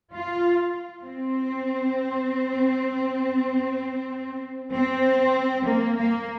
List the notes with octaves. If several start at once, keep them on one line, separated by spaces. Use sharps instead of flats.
F4
C4
C4
A#3
A#3